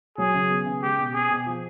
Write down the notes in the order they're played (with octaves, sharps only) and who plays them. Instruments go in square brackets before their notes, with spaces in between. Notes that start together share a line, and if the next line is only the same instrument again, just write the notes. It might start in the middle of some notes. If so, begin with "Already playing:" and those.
[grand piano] F#3 [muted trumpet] G#4
[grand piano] C#3
B3
C#3
[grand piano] G#3 [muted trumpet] G4
[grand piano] B2
[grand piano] C4 [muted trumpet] G#4
[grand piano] B2
F3